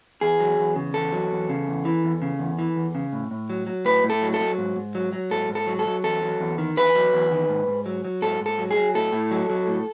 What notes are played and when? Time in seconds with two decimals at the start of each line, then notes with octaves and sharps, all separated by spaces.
0.21 E2 G#4
0.40 F#3
0.59 E2
0.76 C#3
0.94 E2 A4
1.12 F#3
1.31 E2
1.49 C#3
1.67 E2
1.85 E3
2.04 E2
2.22 C#3
2.39 E2
2.59 E3
2.76 E2
2.95 C#3
3.13 A2
3.31 A2
3.50 F#3
3.67 F#3
3.85 A2 B4
4.04 A2
4.10 A4
4.22 F#3
4.34 A4
4.40 F#3
4.58 G#2
4.77 G#2
4.95 F#3
5.13 F#3
5.31 G#2 A4
5.49 G#2
5.55 A4
5.67 F#3
5.79 A4
5.86 F#3
6.04 E2 A4
6.22 F#3
6.40 E2
6.58 D#3
6.77 E2 B4
6.95 F#3
7.13 E2
7.31 D#3
7.49 G#2
7.68 G#2
7.86 F#3
8.05 F#3
8.22 G#2 A4
8.41 G#2
8.46 A4
8.58 F#3
8.71 G#4
8.76 F#3
8.95 A2 A4
9.13 A2
9.31 F#3
9.50 F#3
9.67 A2